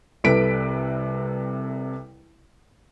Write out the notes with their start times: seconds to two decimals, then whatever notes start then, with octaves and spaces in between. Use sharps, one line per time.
0.24 C2 C3 A4 B4 B6 D7